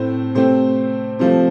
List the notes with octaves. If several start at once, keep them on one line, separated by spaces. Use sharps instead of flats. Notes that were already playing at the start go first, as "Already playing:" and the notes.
Already playing: A2 A3 C4 C5
C3 A3 C4 C5
C3 F3 A3 C5